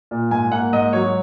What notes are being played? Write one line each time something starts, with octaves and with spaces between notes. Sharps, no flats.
A#2
G#2 G#5
A#3 F#5
G#2 D#5
F#3 C#5